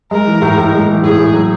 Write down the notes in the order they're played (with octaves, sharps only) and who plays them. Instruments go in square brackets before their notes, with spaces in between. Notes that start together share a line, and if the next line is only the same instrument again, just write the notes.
[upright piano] G#3 [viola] A#4
[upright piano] E3
A2
A2
G#3
E3
[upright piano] A2 [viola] G#4
[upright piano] A2
F#3